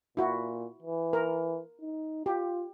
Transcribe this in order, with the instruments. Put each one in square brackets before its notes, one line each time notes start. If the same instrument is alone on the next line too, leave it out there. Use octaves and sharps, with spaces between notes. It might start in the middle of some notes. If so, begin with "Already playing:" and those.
[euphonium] A#2 [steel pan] E4 F#4
[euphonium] E3
[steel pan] A#4
[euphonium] D#4
[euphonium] F4 [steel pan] G4